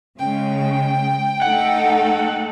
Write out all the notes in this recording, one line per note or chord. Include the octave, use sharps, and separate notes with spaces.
C#3 G#3 G5
A3 D#4 A4 F#5